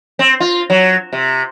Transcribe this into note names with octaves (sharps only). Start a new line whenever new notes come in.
C4
F4
F#3
C3